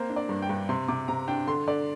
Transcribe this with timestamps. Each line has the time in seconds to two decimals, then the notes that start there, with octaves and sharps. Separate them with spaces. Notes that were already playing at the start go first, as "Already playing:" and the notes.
Already playing: A#3 C4 C5
0.10 D4
0.16 D5
0.29 G2
0.42 G5
0.49 G2
0.69 C3 C6
0.88 C3 D6
1.08 C3 A#5
1.28 D4 G5
1.47 D3 C6
1.68 D3 D5